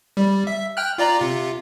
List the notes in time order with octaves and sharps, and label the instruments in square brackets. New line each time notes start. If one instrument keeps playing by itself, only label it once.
[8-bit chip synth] G3
E5
G5 F6 F#6
F4 D5 A#5
C3 F4